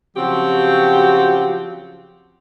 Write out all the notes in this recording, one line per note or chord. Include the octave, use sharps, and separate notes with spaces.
C#3 F3 F#3 C4 F#4 G4